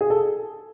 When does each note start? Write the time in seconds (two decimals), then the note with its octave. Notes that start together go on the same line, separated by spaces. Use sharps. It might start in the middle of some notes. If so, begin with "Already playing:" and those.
0.01 G#4
0.10 A4